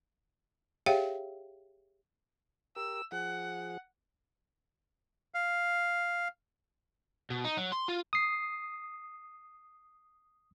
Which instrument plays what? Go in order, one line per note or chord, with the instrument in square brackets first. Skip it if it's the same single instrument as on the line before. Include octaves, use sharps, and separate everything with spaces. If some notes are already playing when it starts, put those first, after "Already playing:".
[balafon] G4 G#4 C#5 E5 F5 G5
[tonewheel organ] G4 A#4 [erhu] E6
[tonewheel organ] F3 G#4 [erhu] F#5
[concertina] F5
[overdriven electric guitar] B2
D#4
F#3
C6
F4
[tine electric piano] D#6 C7